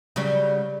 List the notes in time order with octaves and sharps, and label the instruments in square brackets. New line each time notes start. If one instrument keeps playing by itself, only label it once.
[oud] C#3 F#3 G3